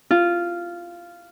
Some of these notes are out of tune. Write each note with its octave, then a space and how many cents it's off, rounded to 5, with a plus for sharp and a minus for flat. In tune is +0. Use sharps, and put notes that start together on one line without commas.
F4 -10